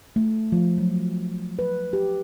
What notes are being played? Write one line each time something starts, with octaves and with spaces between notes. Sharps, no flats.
A3
F3
F#3
B4
G4